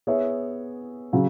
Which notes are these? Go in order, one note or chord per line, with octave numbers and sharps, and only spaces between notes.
B3 G#4 C#5 E5
C#3 F#3